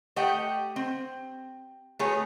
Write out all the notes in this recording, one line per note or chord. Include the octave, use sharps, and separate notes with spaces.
A3 G4 D#5 F#5 G5
C4
A3 B3 F#4 G#4 B4 C#5